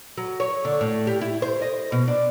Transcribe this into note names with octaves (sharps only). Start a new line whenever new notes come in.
F#3
C#5
D3
A2
G4
E4
C5
D#5
B2
D4